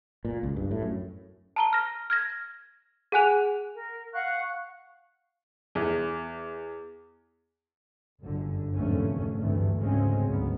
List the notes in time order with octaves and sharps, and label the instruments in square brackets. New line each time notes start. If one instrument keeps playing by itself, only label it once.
[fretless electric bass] A#2
C#2
G2
A2
F#2
[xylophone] A5 A#5 G7
F6 A#6
F6 G#6 A#6
G#4 F#5 G#5 F#6 F7
[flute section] A#4
F5 F#5 C#6 F#6
[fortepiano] E2
[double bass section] G1 F#2 D3
F1 E2 G#2 D3 A3 C#4
D2 G2 C3 E3 A3
D2 G#2 C#3 G#3 C4 C#4
G#1 D2 F#3 B3